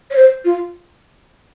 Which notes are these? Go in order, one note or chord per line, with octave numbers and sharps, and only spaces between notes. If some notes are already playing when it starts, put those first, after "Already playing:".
C#5
C5
F4